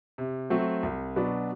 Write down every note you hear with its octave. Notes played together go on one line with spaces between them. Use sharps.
C3
F#3 A3 C4
C2
B2 F#3 B3 D4